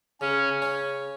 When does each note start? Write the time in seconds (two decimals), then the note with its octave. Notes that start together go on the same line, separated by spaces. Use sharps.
0.21 C#3 C#4
0.62 C#4